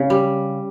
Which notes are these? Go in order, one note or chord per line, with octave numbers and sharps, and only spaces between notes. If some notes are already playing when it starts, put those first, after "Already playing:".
Already playing: C#3
G3